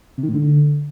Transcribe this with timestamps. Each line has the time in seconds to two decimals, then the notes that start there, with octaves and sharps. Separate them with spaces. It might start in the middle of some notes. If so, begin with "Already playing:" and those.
0.18 C3
0.23 D#3
0.29 A2
0.34 D3